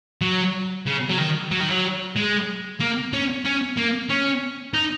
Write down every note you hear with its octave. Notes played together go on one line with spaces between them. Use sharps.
F#3
C#3
F#3
D#3
F#3
D#3
F#3
G#3
A#3
C#4
C#4
A#3
C#4
D#4